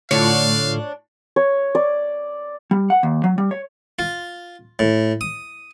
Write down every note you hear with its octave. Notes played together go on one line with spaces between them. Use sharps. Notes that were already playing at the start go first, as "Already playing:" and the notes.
A2 D3 A3 D4 F4 C#5 F5
C#5
D5
G3
F#5
D#2
F#3
G3
C#5
F4
A2
D#6